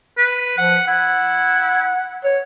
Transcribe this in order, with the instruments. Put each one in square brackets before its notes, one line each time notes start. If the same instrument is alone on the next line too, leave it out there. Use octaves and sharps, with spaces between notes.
[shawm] B4
[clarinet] F3 [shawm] F#5
[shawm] E4 [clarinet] F#5
[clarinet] C#5